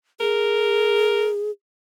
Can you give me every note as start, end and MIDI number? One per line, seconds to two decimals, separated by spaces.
0.20 1.51 68
0.20 1.28 70